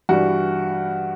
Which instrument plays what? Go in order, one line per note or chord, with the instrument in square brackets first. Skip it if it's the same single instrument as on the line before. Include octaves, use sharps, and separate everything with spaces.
[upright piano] G2 E3 G3 F#4